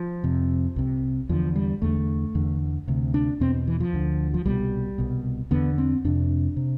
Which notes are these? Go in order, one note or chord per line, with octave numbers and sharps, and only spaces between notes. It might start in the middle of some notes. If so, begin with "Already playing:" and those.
Already playing: F3
F2 C3
C2 C3
E2 D3 F3
G3
E2 D3 A3
E2 D3
D2 C3
D4
E2 B2 C4
E3
F3
D2 D3
F3
C2 B2 G3
C2 B2
E2 D3 B3
C4
F2 C3 D4
C3